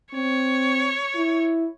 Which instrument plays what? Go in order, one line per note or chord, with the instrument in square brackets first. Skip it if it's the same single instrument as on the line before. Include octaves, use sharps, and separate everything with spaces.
[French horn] C4 [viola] C#5
[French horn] E4